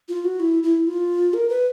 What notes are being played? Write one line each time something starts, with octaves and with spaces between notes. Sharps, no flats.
F4
F#4
E4
E4
F4
A#4
B4